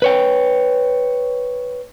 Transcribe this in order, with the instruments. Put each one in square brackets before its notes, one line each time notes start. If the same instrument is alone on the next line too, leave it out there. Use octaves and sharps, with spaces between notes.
[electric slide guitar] B4 C#5 G5